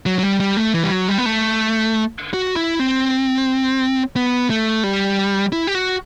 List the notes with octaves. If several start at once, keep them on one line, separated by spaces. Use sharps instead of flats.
F#3
F#3
G3
G3
A3
E3
G3
F#3
G3
B3
A3
F#4
E4
C4
B3
A3
G3
E4
G4
F#4